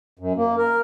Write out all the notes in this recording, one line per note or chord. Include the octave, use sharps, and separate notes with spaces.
F#2
A#3
A#4